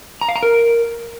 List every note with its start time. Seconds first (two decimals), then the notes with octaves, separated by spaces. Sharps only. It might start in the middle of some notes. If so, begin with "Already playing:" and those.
0.21 A#5
0.28 F5
0.36 A#5
0.43 A#4